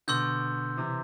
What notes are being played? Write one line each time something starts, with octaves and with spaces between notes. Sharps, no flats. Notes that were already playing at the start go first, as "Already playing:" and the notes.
B2 D3 C6 E6 G6
C3 E3